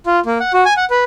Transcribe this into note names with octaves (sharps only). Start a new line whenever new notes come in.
F4
A#3
F#5
F#4
G#5
F#5
B4